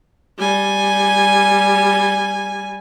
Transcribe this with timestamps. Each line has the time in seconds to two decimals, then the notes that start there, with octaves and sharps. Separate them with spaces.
0.38 G3 G#5